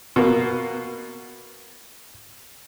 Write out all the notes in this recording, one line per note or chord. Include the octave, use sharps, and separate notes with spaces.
B2 A#3